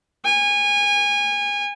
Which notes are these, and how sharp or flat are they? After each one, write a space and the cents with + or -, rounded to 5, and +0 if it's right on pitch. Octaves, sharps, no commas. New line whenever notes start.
G#5 -25